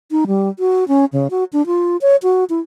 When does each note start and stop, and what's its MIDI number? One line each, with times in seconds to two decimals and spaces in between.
0.11 0.25 63
0.27 0.49 55
0.59 0.84 66
0.88 1.05 61
1.13 1.27 49
1.31 1.44 66
1.53 1.65 62
1.67 1.97 65
2.01 2.16 73
2.23 2.44 66
2.50 2.60 64